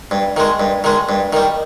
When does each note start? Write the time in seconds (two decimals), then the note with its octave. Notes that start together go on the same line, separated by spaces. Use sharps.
0.11 G2
0.37 D#3 G#3
0.60 G2
0.84 D#3 G#3
1.09 G2
1.33 D#3 G3